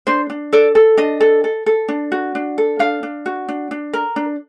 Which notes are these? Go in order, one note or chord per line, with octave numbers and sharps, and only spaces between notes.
D4 C5
D4
A4 D5
A4
D4 D#5
A4
A4
A4
D4
F#4
D4
A4
D4 F5
D4
F#4
D4
D4
A#4
D4